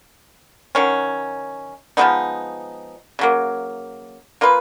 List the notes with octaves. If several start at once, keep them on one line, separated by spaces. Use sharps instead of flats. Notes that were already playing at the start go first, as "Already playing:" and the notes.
D#3 F#3 C#4
F3 G#3 B3 D#4
C#3 F#3 A#3
A#3 F4 B4